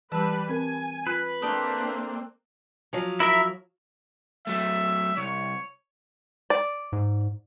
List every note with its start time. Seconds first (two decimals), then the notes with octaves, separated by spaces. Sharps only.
0.12 E3 G3 B4 A5 E6
0.49 C4 A#4 G#5
1.07 F4 B4
1.42 A3 A#3 C4 D4 G4 D5 D#6
2.93 F3 F#3
3.20 E4 A#4 E5
4.47 F#3 A3 E5
5.17 C2 C#5
6.50 D5
6.92 G#2